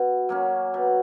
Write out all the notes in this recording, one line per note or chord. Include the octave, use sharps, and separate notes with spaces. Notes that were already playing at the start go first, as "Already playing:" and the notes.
Already playing: B2
F#3 A#3 C#4
B2